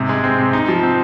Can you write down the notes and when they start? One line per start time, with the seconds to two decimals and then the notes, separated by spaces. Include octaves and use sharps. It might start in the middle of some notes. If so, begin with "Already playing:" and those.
Already playing: G#2 C3
0.09 G#3
0.24 C4
0.39 C3
0.53 D#4
0.68 F3
0.83 C4